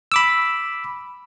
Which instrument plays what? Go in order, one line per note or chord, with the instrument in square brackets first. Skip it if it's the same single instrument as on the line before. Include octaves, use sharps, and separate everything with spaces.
[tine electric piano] B5 D6 E6